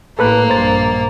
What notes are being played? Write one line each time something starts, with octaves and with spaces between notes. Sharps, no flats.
A1 A2 A#3 A4 B4 F#6
A#1 G2 C5 A6